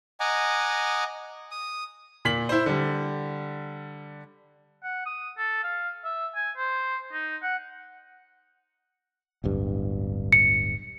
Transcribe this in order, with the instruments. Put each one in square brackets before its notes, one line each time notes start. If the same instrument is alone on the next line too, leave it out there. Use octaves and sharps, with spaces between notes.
[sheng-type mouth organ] D#5 F#5 G#5 A#5 D6
D#6
[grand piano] A#2 B6 F#7
E4 C5
D3 G3
[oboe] F#5
D#6
A4
F5
E5
G#5
C5
D#4
F#5
[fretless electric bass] D1 G1 G2
[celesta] C#7